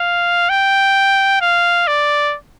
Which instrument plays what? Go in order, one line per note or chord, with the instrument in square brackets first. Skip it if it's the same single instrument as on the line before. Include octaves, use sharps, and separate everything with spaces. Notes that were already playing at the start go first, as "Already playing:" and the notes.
Already playing: [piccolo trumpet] F5
G5
F5
D5